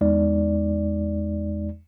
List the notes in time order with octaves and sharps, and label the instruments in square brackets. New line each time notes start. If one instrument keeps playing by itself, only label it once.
[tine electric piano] E2 G#3 D#4 D5